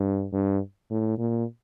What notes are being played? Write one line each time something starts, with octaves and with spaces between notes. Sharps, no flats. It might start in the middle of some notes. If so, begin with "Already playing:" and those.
Already playing: G2
G2
A2
A#2